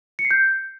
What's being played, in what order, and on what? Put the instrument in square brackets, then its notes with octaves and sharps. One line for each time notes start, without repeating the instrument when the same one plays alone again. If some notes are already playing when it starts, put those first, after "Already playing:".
[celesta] C#7
C7
G6